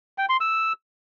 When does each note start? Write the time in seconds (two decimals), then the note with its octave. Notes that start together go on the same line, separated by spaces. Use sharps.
0.18 G5
0.29 C6
0.40 E6